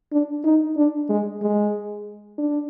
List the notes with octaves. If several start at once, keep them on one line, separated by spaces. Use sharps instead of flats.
D4
D#4
D4
G#3
G#3
D4